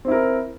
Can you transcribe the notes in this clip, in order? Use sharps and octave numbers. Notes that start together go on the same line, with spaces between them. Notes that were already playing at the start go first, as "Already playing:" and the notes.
C4 E4 A#4